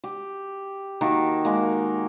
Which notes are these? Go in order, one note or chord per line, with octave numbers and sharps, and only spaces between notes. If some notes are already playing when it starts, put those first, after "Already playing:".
G4
D#3 A#3 F#4 A5
G#3 A#3